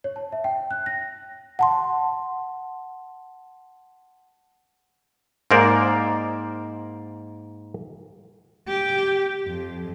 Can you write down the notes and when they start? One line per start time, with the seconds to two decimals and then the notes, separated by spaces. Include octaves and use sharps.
0.04 C#5
0.16 A5
0.32 E5
0.44 G5
0.71 F#6
0.86 A#6
1.59 F#5 A5 C6
5.51 G#2 A#3 A#4 C5 D5
8.69 G4
9.47 F2